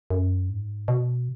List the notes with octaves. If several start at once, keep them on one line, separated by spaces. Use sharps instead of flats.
F#2
G#2
B2